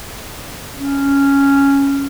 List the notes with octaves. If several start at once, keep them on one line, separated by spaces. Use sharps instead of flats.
C#4